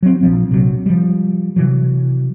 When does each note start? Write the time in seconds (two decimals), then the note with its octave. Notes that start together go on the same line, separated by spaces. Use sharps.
0.03 F#3 C4
0.21 A#1 F3 C4
0.51 A#1 C3 F3 F#3
0.86 F3 G3
1.56 C3 E3 F#3